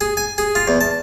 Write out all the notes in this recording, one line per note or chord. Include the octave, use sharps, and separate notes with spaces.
G#4
G#5
G#4
F4
E2
A5